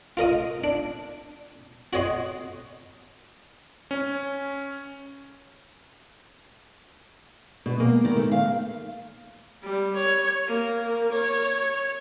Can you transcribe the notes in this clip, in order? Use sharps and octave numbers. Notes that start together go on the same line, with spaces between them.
F4 A#4 D#5 D#6
D4
F#4 C#5 D#5 C6
C#4
B2
A#3
D#3
A3
F5
G3
C#5
A#3
C#5